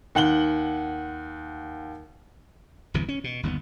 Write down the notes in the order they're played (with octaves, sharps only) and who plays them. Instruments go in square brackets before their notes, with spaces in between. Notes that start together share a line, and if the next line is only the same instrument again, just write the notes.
[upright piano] D#2 F#5 F#7 G7
[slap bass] G1 E2 C3 E3
C#4
B2
G1 D#2 B2 B3